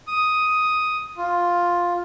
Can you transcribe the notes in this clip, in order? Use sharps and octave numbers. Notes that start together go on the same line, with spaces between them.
D#6
F4